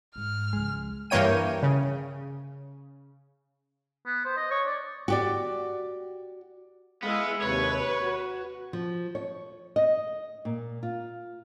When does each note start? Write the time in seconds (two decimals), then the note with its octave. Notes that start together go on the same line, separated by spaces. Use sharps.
0.16 G#2 F6
0.53 C#2 F3 G#3
1.10 G2 E3 A#3 C#5 G5 D#7
1.63 C#3
4.06 B3
4.25 C5
4.37 D#5
4.51 C#5
4.66 D5
5.08 F#4 G4 D5
7.03 G#3 B3 E4 G#4 F5
7.42 D#2 C3 B4 C#5
8.02 F#4
8.73 F3
9.15 C#5
9.76 D#5
10.45 A#2
10.83 F4